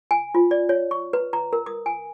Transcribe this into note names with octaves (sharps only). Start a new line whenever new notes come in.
G#5
F4
D5
C#5
C#6
B4
A#5
A#4
D#6
G#5